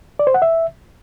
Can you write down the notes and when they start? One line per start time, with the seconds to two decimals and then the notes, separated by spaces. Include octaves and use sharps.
0.19 D5
0.27 C5
0.34 F#5
0.42 E5